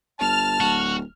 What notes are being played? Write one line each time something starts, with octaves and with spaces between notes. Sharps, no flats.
G1 A5 F6
D1 F#4